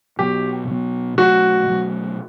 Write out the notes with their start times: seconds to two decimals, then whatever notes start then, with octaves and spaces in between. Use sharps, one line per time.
0.19 B2 F#3 B3 G4
0.67 B2 F#3 B3
1.17 B2 F#3 A3 F#4
1.66 B2 F#3 A3